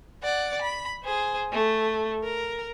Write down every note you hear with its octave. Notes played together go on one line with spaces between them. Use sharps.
D5 F#5
B5
G#4 C5
A3
A#4